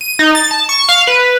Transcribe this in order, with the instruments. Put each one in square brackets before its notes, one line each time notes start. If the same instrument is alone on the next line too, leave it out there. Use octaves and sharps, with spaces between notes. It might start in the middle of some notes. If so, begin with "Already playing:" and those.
[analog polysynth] D#7
D#4
A6
A5
C#6
F5
B4